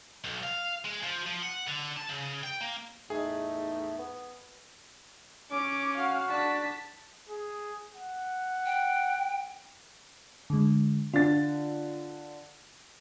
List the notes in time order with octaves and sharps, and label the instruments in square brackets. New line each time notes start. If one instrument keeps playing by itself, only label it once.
[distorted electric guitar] B1
F5
G#3
F3
F3
F#5
D3
A5
C#3
G5
A#3
[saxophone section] E2 A2 D#4 [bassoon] A3 [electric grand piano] G#4
[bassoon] B3
[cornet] C#4 [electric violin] D6
[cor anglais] F#4 [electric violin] F5
[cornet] D4 [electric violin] A5 B6
[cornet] G#4
F#5
[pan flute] G5
[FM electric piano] D3 G#3
[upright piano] D3 A6 [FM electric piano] F4